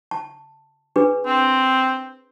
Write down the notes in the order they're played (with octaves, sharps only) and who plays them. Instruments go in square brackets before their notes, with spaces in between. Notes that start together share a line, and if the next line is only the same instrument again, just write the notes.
[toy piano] A5
D4 G#4 B4
[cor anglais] C4